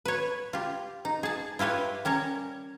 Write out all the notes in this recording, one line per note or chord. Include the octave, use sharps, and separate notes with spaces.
B4 C#5
F4 G4
D#4
G#4 A5
E4 F4 G4 B4 C#5
G3 C#4 A#4 C#5